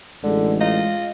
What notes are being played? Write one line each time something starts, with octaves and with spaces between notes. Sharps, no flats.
A1 D3 G#3
F4 D#5